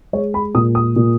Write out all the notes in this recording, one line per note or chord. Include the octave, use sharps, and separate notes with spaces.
G#3 C#5
B5
A#2 D#6
D#6
A#2